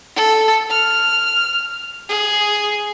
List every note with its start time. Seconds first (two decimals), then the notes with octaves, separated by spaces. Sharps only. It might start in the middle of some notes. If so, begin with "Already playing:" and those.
0.16 A4
0.70 F6
2.09 G#4